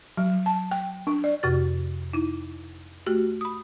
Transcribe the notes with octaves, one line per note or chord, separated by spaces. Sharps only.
F#3
A5
G5
D4
D5
F2 C3 F#4 G4 F6 A6
D#4 E4
A3 F#4 G4
B5 D#6